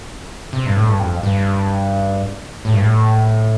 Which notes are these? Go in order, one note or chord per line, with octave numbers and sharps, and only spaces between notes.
C3
G2
A2
G2
F2
G2
A2
G2
A2